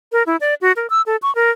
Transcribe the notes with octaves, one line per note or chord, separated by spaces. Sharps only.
A#4
E4
D5
F#4
A#4
E6
A4
C#6
A#4